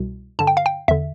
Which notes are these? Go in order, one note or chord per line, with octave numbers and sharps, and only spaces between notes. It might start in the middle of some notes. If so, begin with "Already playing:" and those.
Already playing: C2 B2
G2 D3 A5
G5
F5
G5
E2 D3 E5